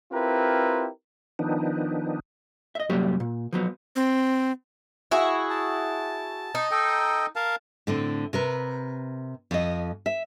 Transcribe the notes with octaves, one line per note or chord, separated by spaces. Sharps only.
C4 E4 F4 G4 A#4 B4
D#3 F3 B3 D4 D#4
D#5 E5
C2 F#2 F#3 G3 A#3 G4
A#2
F3 F#3 B3
C4
E4 F#4 G#4
A5
D#4
A4 D#5 G5
A#4 F5 A5
A2 D3 C4
C3 A#4 B4
F2 D#5
E5